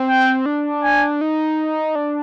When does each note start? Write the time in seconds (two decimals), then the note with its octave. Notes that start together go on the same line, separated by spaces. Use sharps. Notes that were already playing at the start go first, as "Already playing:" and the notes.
Already playing: C4
0.09 G5
0.46 D4
0.83 G#5
1.21 D#4
1.95 D4